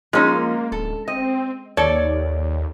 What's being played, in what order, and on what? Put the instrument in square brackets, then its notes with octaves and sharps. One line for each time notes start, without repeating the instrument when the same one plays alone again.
[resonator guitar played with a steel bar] F3 D#4 [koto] G#3 C#4 [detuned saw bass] A#3
[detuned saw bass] D1 [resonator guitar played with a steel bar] A4
[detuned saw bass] C4 [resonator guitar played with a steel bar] D#5
[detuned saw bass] D#2 [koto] A4 [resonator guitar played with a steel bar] C#5 D5